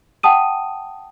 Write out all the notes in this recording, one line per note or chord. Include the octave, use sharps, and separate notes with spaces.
F#5 G5 A5 D#6 D#7